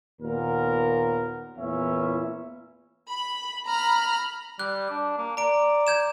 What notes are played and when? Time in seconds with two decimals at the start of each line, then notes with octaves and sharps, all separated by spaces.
0.20 D#2 A#2 B3 A#4
1.58 E2 A#2 E3 C#4 E5
3.08 B5
3.67 A#5 B5 F6
4.59 G3 F#6
4.90 D4
5.18 A#3
5.37 D5 A#5 D7
5.87 G6 G#6 E7